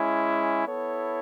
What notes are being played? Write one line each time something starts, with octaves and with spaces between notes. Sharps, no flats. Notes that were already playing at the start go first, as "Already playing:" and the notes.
Already playing: G#3 C#4 E4
B3 E4 A4 C#5